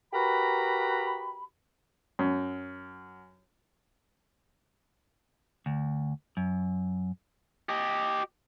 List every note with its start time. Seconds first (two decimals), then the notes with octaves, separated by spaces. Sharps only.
0.13 F#4 G4 A#4 B4 A#5 B5
2.19 F#2
5.66 D2
6.37 F#2
7.69 G4 D#5